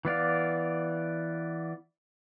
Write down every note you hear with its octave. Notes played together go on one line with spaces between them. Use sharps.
E3 B3 D5 F5